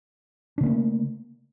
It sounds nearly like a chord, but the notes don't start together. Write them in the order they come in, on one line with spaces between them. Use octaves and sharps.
D4 C#3 A#3 A3